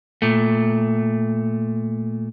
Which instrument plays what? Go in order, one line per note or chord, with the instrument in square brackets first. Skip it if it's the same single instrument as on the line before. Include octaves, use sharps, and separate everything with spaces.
[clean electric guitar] A#2 A3